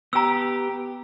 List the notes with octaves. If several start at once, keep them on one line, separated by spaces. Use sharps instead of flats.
B3 G4 A#5 E6